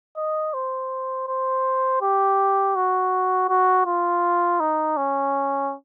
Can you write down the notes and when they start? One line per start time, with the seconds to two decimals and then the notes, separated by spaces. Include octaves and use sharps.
0.17 D#5
0.54 C5
1.28 C5
2.02 G4
2.75 F#4
3.49 F#4
3.86 F4
4.60 D#4
4.97 C#4